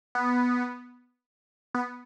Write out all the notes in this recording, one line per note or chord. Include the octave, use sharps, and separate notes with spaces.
B3
B3